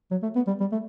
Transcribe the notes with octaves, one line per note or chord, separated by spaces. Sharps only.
F#3
A3
B3
G3
G3
A3